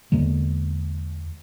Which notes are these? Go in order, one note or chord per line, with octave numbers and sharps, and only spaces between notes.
E2 D3 G#3 A#3